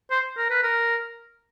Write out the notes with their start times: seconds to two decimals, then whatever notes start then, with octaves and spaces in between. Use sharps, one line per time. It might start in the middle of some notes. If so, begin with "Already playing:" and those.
0.11 C5
0.37 A#4
0.50 B4
0.63 A#4